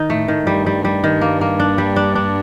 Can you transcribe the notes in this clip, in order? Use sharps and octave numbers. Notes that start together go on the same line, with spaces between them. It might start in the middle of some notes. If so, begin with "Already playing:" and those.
Already playing: D#3 D#4
A2 A3
D#3
G2 G3
G3
G3
D#3
A#3
A#3
D4
G3
D4
D4